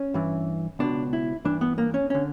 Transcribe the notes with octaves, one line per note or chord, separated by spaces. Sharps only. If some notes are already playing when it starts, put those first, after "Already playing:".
Already playing: C#4
G2 E3
C#2 B2 D4
E4
G2 E3 D4
B3
A#3
C#4
D3 C#4